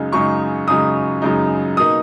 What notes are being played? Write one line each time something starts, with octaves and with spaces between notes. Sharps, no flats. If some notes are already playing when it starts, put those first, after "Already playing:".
Already playing: F#2 C#3 G#3 D#4
F#2 C#3 G#3 D#4 C#6
F#2 C#3 G#3 D#4 D#6
F#2 C#3 G#3 D#4
B2 A#3 D#4 D#6